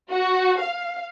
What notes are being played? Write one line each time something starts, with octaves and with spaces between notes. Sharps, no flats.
F#4
F5